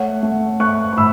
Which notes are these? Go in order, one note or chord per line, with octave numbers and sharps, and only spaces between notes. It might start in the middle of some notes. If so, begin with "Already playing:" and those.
Already playing: A3 C#5 F#5
A3
A3 C#6 F#6
C#6
A2 B5 E6